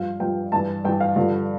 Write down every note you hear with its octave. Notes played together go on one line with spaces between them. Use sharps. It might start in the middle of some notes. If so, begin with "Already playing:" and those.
Already playing: G2 F3 F5
G2 F3 G5
G2 E3 A5
G2 E3 G5
F5
G2 D3 F3